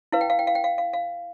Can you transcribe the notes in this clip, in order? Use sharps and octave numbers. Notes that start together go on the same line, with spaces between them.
E4 B4 F5
G5
F5
G5
F5
G5
F5
F5
F5